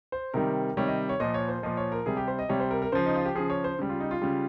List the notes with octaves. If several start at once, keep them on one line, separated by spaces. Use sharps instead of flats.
C5
C3 D#3 G3 A#4
C3 D#3 G3 C#5
D#5
C#5
A#2 F3 D#5
C#5
C5
A#2 F3 D#5
C#5
A#4
C3 G3 G#4
G4
C5
D#5
C3 G3 C#5
C5
A#4
A#4
C#3 F3 C5
D#4
F4
G4
C#3 F3 G#4
C#5
C5
C#3 G3
F4
D#4
F4
C#3 G3